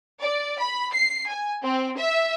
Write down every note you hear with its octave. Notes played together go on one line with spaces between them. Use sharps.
D5
B5
C7
G#5
C4
E5